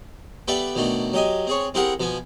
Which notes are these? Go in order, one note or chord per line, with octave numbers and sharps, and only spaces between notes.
B3 G4 A4 B4 D5 E5
B2 D#3 F#3 A3 D4
F#3 G4 D#5 G#5
C4 G#4 C#5
C4 E4 G4 G#4 A#4 F#5
B2 F3 B3 G#5